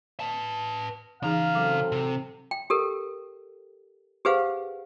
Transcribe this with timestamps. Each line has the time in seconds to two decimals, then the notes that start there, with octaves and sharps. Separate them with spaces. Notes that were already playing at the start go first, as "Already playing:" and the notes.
0.20 B4 A5
1.23 C#3 E3 D#4 G#4 F5 A#5
1.55 F#3 C4 F#4 A4 D6
1.92 C3
2.51 G5
2.70 G4 A4 A#4
4.25 G4 G#4 B4 C5 F5 F#5